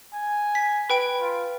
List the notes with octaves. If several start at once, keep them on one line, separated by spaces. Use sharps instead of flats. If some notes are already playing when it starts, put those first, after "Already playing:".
G#5
B6
B4 G5 B5 D7
F4